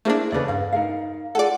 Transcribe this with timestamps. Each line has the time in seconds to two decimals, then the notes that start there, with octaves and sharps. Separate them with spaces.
0.05 A3 A#3 D4 E4 G#4 C5
0.32 E2 C#3 A4 B4 D5
0.48 G2 F5
0.72 D#4 A#4 F5
1.35 F4 G#4 A4 D5 F#5